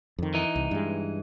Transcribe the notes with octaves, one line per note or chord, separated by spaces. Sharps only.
F2 D#3
E3 D#4
C2
G2 G#3